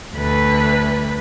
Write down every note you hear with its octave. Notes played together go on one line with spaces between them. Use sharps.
D2 B4